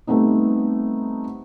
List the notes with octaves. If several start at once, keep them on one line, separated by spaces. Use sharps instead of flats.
G3 A3 B3 C4 D#4